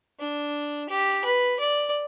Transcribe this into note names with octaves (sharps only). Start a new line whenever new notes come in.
D4
G4
B4
D5